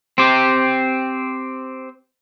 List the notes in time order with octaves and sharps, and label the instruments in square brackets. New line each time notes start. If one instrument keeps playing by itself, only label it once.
[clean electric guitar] C4 G4